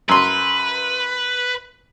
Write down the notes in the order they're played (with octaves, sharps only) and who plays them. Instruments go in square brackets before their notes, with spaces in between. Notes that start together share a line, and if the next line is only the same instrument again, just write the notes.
[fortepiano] F#2 C6 [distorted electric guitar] B4